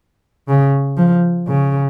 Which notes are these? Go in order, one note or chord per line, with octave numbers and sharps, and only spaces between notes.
C#3
F3
C#3